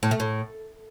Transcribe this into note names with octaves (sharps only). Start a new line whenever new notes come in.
A2
A3
A2